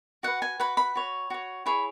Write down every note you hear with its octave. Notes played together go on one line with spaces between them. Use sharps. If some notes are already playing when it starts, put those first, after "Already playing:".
F#4 B4 F#5
G#5
F#4 B4 B5
B5
F#4 C#5
F#4 C#5
E4 G#4 C#5 B5